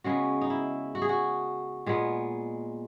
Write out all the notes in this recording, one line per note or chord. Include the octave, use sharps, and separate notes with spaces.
C#3 G#3 B3 F#4
D#4
E4
F#4
G#4
F#4
A#2 G#3 B3